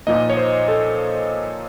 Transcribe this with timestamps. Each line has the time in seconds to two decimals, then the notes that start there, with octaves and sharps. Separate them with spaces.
0.07 A#2 F3 A#3 D#4 D#5
0.30 C#5
0.37 C5
0.68 A4